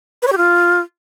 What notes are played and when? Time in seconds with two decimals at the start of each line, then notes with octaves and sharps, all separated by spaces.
0.22 B4
0.27 C#5
0.32 G4
0.37 F4